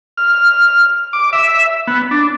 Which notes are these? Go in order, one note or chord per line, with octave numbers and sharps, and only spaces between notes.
F6
D6
E5
B3
D4